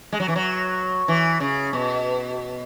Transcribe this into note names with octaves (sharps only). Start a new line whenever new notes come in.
G#3
F#3
E3
F#3
E3
C#3
B2